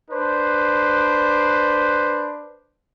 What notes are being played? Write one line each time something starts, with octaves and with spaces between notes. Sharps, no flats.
D4 B4 C5